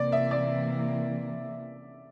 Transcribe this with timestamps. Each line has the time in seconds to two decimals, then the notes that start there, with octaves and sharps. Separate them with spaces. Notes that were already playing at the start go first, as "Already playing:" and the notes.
Already playing: C3 E3 A#3 D5
0.12 E5
0.31 D5